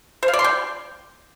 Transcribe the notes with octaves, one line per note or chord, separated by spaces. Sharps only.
C5
F5
D5
C6
G5